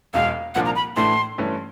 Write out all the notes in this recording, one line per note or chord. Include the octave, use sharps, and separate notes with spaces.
E1 E2 B2 G#3 F5
C2 A#2 F3 A#3 D4 F#5
A#5
B5
A2 E3 A3 D4 C6
G2 E3 A3 C#4